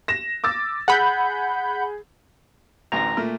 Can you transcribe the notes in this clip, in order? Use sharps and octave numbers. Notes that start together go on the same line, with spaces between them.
A#6 E7
D6 E6 A6
G#4 F#5 B5 G6
A1 D2 A#5 A#6
A#2 A3